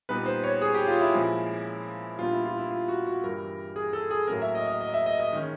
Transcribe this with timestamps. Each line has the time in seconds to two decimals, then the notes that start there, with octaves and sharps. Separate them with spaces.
0.09 A#2 G3 B3 D#4 B4
0.26 C5
0.44 C#5
0.61 G#4
0.74 G4
0.87 F4
1.01 E4
1.14 A#2 F3 G#3 C#4
2.18 A#2 G3 B3 D4 F4
2.32 E4
2.45 F4
2.58 E4
2.71 F4
2.88 F#4
3.06 F#4
3.24 G2 E3 G3 A#4
3.76 G#4
3.93 A4
4.11 G#4
4.28 A2 F#3 A#3 C#4 A#4
4.42 E5
4.55 D#5
4.67 D#5
4.81 D#5
4.94 E5
5.06 D#5
5.20 D#5
5.33 D#3 G#3 C#4